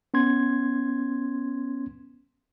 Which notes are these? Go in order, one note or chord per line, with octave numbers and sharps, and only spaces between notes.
B3 C#4 C6 G#6